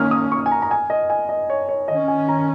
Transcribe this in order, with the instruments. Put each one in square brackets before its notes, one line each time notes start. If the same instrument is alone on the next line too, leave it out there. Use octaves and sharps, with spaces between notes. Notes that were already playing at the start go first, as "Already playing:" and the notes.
Already playing: [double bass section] D#3 A#3 C#4 [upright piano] D#6 F6
[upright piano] D#6
C#6
G#5
A#5
A#5
G#5
D#5
G#5
D#5
C#5
C#5
[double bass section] D#3 C#4 [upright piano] D#5
[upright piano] G#5
A#5